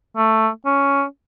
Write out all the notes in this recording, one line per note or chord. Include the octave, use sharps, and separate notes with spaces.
A3
C#4